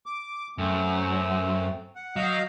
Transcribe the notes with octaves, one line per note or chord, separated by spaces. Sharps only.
D6
F#2 A3 C4
F#5
F#3 D#5 F5 G6